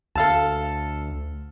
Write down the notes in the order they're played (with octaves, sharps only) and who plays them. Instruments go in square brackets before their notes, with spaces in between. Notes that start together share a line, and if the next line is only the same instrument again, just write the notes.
[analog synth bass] D2 [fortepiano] A4 F5 A5